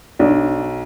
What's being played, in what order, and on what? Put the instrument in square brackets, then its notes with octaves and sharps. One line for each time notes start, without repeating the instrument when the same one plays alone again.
[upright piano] B1 [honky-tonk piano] D4